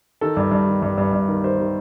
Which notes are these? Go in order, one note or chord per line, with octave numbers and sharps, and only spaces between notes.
D#3 A4
G2
G2
D#3
G2
G2
G2
D#3
D#3 C5
D#3